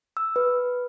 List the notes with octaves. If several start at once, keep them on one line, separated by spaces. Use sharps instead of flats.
E6
B4